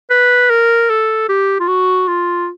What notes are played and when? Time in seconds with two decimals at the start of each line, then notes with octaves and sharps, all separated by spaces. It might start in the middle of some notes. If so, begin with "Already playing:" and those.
0.10 B4
0.50 A#4
0.90 A4
1.29 G4
1.60 F4
1.68 F#4
2.08 F4